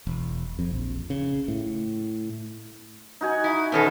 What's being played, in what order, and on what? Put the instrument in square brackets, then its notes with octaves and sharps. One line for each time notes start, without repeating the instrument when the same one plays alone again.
[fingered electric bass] E1
F2
A#1
C#3
A2
[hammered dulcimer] D#4 F#4 G#5
[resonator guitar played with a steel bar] E4
[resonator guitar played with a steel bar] B2 D#3 A4 [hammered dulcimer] B3 C#4 G#4